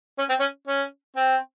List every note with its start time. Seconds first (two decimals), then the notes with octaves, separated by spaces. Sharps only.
0.18 C#4
0.29 C4
0.40 C#4
0.67 C#4
1.16 C4